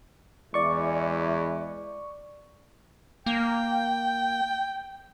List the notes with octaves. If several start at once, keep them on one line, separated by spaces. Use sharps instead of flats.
E2 G#3 E4 D5 C#6
A#3 G5